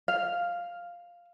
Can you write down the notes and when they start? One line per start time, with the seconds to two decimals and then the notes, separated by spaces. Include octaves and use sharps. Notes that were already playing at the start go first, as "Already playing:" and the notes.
0.08 F5